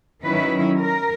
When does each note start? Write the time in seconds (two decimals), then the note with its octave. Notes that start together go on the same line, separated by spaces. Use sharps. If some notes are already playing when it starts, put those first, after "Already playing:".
0.23 D#3 F#3 C#4 E4 B4
0.80 A#4